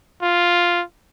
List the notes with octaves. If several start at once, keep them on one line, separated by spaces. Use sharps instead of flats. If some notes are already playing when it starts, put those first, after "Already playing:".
F4